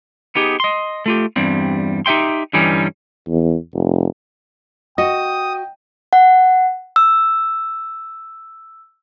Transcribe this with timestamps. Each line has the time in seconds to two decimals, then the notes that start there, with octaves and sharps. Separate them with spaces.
0.35 B3 D#4 G4 G#4
0.60 D#5 C6
1.06 A3 F4 G4
1.36 E2 G2 G3 C4
2.06 D#4 G4 E5 G5 C6
2.53 G2 D3 E3 G3 C#4 D#4
3.28 E2
3.74 F1
4.98 F#4 D#5 G5 D#6
6.13 F#5
6.96 E6